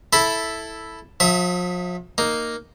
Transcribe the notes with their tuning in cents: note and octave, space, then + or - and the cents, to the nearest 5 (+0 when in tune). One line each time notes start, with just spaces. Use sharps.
E4 +0 A4 +0 B5 +0
F3 +40 E5 +0 D#6 +35
A#3 +0 D#4 +0